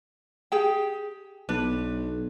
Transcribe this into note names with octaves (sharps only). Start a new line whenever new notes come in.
G4 G#4 G5
B1 D4 B4